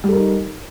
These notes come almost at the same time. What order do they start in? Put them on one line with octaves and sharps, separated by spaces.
G3 A4 A#4 D#4